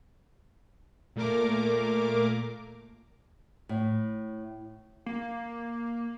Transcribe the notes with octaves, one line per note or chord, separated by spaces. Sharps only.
A#2 A3 A#3 A#4 D6
A2
A#3